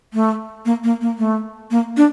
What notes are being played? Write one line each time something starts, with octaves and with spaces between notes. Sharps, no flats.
A3
A#3
A#3
A#3
A3
A#3
D4